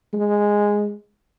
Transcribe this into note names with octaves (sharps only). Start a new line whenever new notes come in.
G#3